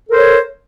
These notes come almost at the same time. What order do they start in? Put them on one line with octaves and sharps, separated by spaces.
A4 A#4 C5 C#5